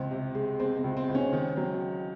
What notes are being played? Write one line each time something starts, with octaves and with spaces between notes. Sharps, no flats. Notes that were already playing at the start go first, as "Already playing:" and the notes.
Already playing: C#2 C4
C3
G#3
G#3 C4
C4
C#2
C4
C#2
C#4
D#3
F#3